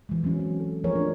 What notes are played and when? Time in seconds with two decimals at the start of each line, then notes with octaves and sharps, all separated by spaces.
0.09 E3 G#3
0.23 E3 F#3 C4 C#4
0.40 C#4
0.60 A4
0.84 F3 A3 G#4 A#4 C#5
0.95 D4